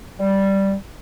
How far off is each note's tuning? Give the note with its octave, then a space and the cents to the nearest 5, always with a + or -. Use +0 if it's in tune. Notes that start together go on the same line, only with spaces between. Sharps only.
G3 -5